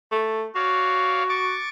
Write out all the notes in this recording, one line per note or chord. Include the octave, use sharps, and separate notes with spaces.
A3
F#4 C#5 D5 F5
C#6 D6 A6